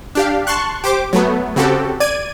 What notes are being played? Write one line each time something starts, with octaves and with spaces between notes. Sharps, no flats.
D4 G4 F5
A5 C6 C#6 F#6
G4 C5 D6
F#3 A3 B3
C#3 C4 F#4 G4 A4
D5 G#6 D#7